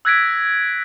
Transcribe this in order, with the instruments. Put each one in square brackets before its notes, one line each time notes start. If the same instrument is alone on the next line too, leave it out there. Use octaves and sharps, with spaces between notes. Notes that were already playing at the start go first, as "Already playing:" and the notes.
[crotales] E6 F#6 G#6 A#6 B6 D7